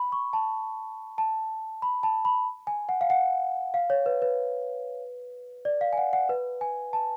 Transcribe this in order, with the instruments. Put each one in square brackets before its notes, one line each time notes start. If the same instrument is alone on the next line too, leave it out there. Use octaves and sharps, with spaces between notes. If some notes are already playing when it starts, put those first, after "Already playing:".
Already playing: [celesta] B5
C#6
A5
A5
B5
A5
B5
G#5
F#5
F5
F#5
F5
C#5
B4
B4
D5
F5
G#5
F#5
F#5
B4
G#5
A5